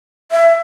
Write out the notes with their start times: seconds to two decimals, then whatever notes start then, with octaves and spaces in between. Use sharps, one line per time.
0.31 E5